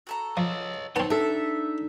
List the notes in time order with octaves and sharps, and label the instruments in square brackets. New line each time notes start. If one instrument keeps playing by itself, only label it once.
[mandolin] F#4 A4 A#5
[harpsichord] F3 [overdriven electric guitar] C#5 D#5
[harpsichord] B3 C4 [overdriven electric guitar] D#4 [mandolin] C#5 A5
[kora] D4 A4 [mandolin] E5